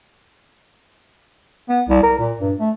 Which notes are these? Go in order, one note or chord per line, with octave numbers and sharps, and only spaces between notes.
B3
C2
A#4
A#2
G2
A3